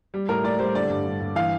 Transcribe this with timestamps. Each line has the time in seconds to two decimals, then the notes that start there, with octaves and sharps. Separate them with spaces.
0.14 G3
0.29 A2 A#4
0.44 A2 D5
0.59 G3 C5
0.75 D3 D5
0.90 G2
1.05 G2
1.21 G2
1.36 E3 F5